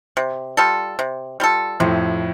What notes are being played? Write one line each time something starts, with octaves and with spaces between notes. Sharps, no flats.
C3
G3 F4 A4
C3
G3 F4 A4
F2 A2 C3